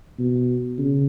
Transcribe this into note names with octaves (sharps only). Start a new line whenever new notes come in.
B2
C#3